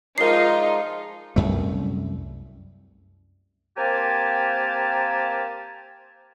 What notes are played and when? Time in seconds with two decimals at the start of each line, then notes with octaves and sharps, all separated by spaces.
0.18 F3 G#3 D#4 F4 A#4 D5 C7
1.36 C2 F#2 A3
3.77 A#3 C4 G4 A#4 G#5 A5